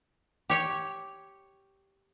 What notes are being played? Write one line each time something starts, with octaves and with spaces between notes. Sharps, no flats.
G4 C#5 G5